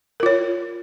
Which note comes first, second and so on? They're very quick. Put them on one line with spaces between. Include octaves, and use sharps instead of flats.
A#4 F4 C#5